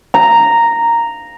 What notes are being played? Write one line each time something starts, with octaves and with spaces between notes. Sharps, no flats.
A#5